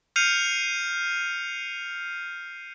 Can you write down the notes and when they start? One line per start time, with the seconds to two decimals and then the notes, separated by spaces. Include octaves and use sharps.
0.16 F6 G6 C7 C#7 D#7 F7